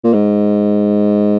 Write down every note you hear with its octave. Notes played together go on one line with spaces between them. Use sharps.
A#2
G#2